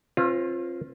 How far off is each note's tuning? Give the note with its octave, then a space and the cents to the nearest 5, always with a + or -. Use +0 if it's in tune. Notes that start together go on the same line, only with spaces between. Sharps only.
C4 +40 F4 -5 B4 +25